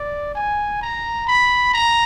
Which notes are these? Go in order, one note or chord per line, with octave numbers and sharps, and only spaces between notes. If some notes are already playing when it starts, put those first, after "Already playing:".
Already playing: D5
G#5
A#5
B5
A#5